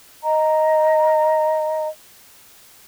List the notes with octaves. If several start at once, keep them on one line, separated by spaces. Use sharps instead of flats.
D#5 A#5